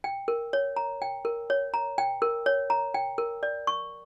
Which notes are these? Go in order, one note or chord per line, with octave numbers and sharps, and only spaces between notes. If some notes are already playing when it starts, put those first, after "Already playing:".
G5
A#4
C#5
A#5
G5
A#4
C#5
A#5
G5
A#4
C#5
A#5
G5
A#4
D5
C#6